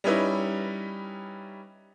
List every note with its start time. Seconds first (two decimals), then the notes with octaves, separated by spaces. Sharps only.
0.04 G3 C#4 D#4 E4 B4 D#5